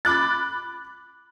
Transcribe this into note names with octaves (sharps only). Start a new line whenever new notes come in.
B5 D6 F#6 A6